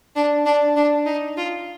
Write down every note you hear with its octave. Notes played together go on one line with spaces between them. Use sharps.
D4
D4
D4
D#4
F4